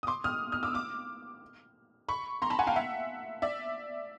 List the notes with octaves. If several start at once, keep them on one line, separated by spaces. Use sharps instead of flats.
D#6
C6 D6
D#6 F6
D#6 F6
D6 E6
D6 E6
B5 C#6
A#5 C6
A5 B5
F#5 G#5
F5 G5
E5 F#5
D5 E5